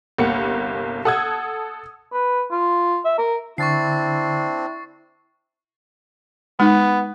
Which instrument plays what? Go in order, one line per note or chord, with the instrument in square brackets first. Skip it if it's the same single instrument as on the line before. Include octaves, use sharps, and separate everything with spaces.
[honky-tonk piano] G1 C2 A#3 F#5 C#7
A4 F#5 D#6 E6 G#6
[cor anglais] B4
F4
E5
A#4
[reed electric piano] D3 [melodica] C4 D4 [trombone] E4 [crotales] C#6 A6 C7
[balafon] G#3 D#4 [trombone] B3